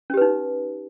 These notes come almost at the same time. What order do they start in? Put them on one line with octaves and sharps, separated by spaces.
C#4 G4 B4 D#4